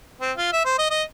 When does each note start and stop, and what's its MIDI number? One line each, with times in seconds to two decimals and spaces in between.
0.21 0.32 60
0.37 0.53 65
0.53 0.61 76
0.65 0.74 72
0.79 0.90 75
0.90 1.03 75